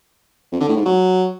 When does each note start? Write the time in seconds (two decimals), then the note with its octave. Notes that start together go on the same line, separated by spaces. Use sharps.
0.52 F2
0.60 D3
0.69 A2
0.77 G#2
0.85 F#3